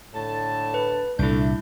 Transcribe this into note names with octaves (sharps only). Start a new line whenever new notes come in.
A2 D3 A5
B4
C2 A#2 A3 D4 E4 G6